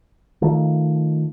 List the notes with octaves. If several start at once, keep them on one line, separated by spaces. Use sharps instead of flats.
D#3 F3 A3